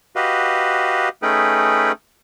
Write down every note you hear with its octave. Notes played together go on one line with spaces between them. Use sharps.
F#4 G4 B4 D#5 F5
A3 C#4 D#4 G#4 B4 G5